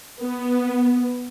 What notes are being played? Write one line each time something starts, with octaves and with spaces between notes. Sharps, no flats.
B3